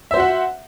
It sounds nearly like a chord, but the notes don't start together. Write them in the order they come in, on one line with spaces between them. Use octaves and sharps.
E5 C5 F#4 F#5